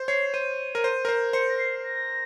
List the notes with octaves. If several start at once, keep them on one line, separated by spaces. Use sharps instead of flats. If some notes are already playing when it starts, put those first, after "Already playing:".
Already playing: C5
C#5 C7
C5 D#7
A#4
C5
A#4
C5
C5 C#7
A#6
C7
A#6